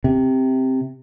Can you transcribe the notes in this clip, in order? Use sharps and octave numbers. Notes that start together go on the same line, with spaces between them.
C3